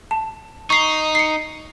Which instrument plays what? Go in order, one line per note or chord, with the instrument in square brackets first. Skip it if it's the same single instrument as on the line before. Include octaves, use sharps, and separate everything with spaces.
[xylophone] A5
[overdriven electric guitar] D#4 [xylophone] C#6 C7
[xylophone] C7 C#7